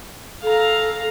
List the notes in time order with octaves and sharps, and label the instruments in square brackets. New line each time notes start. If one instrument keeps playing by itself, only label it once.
[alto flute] A4 [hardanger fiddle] F5 A#5